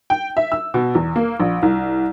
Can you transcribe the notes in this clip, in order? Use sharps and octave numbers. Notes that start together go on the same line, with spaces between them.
G5
E5
E6
B2
E2
A#3
A#1
C2